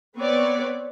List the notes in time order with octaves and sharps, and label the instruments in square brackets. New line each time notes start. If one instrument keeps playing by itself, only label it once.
[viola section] B3 C4 B4 C#5 D5